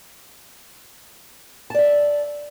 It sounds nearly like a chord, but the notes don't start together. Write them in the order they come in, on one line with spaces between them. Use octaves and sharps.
A5 D5 E5